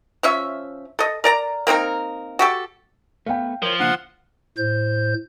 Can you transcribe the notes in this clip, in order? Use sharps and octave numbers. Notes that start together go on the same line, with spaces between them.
F3 C#4 E5
A4 D#5
A#4 D5 A#5
A#3 C4 D#4 A#4
F#4 G4 A4
A3 B3 F5 G5
F3 A#4 C#5
C#3 A#3 D4 F#5
A2 C5 G6